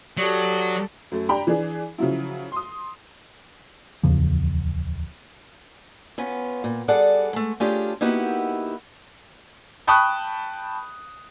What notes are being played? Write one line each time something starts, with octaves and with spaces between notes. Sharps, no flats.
F#3 G4 A4 D5 C#6 D#6
F#2 A3
D4 G4 G5 A#5 B5
E3 D4 G#4
C#3 F3 F#3 E4
C6 D#6
D1 E2 C#3 F3
B3 C#4 F4
A#2
G3 G#4 A4 D5 F#5
G#3 A3
A3 C#4 D4 F4 G4 G#4
A#3 B3 D#4 E4 F#4 G4
G5 A5 B5 C#6 D#6 F#6